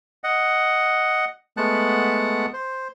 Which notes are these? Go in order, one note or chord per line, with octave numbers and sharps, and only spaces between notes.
D#5 F#5
G#3 A3 B3 F#5 A5 F#6
C5